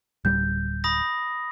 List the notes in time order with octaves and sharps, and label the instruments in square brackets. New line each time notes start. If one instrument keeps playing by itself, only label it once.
[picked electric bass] D1 G3 [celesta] G6
[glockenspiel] B5 D#6 A#6